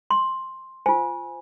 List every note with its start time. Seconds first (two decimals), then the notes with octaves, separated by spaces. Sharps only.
0.10 C6
0.86 F4 C5 G#5